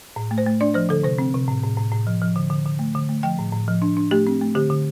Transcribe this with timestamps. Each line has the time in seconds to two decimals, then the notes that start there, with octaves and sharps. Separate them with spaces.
0.16 A2
0.31 A3
0.38 C5
0.46 A3
0.61 D4 D5
0.74 F3 C5
0.89 D3 A4
1.04 C3 C5
1.18 C4
1.34 C3
1.48 A2
1.63 A2
1.77 A2
1.92 A2
2.07 F3
2.22 F3
2.36 D3
2.50 D3
2.66 D3
2.79 A3
2.95 D3
3.09 A3
3.23 F3 G5
3.39 A2
3.53 A2
3.68 F3
3.82 D4
3.97 D4
4.11 A3 G4
4.27 C4
4.41 A3
4.55 D3 G4
4.70 D3